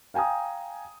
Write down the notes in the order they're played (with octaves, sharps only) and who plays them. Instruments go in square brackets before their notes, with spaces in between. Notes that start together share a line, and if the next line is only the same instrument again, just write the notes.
[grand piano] F5 G5 G#5 A#5 D#6